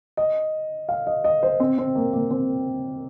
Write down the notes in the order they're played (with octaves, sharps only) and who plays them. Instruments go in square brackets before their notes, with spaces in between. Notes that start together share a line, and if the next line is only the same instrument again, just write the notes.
[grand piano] D#5
F5
D#5
D#5
C5
C4
C4
A#3
A#3
C4